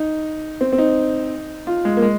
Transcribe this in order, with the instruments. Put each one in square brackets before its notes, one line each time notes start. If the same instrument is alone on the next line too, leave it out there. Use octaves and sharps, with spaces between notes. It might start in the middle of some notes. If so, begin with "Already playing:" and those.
Already playing: [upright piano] D#4
C4
C4
D#4
F4
G#3
A#3
G#3